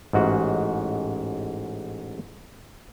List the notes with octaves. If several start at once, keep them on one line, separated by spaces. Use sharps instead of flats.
A1 G#2 F#4